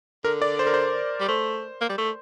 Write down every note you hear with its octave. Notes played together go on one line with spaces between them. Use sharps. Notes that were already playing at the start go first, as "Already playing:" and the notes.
D3 A#4
D5
C5
A#4
C5
G3
A3 C5
A#3
G3
A3